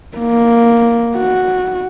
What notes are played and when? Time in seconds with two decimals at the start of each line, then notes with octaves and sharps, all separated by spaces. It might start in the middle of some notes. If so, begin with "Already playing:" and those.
0.18 A#3
1.16 F#4